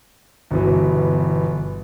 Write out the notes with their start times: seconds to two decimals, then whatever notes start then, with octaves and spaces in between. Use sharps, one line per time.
0.51 G1 B2 E3